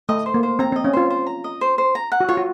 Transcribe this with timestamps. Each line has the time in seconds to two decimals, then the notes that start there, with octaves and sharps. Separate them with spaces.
0.09 A3 D#5
0.26 C5
0.34 A#3
0.43 C5
0.59 C4 A#5
0.72 C4 D#5
0.84 C#4
0.93 F4 C5
1.10 C5
1.27 A#5
1.44 D#5
1.61 C5
1.78 C5
1.95 A#5
2.12 F#5
2.20 F#4
2.29 F4 C#5
2.37 F#4